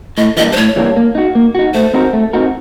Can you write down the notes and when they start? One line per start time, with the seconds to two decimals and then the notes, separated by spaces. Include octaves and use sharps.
0.17 A2 D#5
0.37 E3 G3 A#3 D4 D#5
0.52 C5
0.56 A2 C#5
0.76 E3 G3 A#3 D4
0.96 A#3
1.15 D#4 F#4
1.35 A#3
1.55 D#4 F#4
1.74 A3 C5
1.94 C4 D#4 F#4 A#4
2.13 A3
2.33 C4 D#4 F#4 A#4